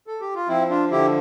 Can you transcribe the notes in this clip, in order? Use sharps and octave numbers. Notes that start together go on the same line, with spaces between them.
A4
G4
F4
F3 C4 E4
D4 F4
D3 E4 G4